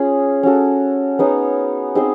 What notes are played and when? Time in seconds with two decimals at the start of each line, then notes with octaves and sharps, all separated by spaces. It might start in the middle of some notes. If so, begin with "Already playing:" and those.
Already playing: C#4 F4 G#4
0.43 C#4 F#4 A4
1.19 B3 D#4 G#4 C#5
1.95 C4 D#4 G#4 C5